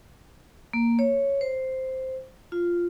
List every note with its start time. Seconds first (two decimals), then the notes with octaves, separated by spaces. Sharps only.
0.73 A#3
0.99 C#5
1.41 C5
2.52 F4